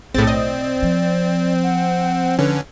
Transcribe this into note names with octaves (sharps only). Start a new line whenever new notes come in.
B1 A2 C4 G#4 A6
D5 D#5
F3
F#5
D3 C#4 B4